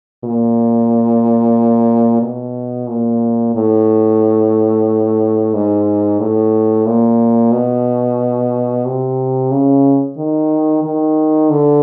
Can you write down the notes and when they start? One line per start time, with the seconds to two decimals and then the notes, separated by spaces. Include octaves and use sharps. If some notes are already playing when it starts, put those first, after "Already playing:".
0.24 A#2
2.22 B2
2.88 A#2
3.55 A2
5.54 G#2
6.20 A2
6.86 A#2
7.52 B2
8.85 C3
9.51 C#3
10.17 D#3
10.84 D#3
11.50 D3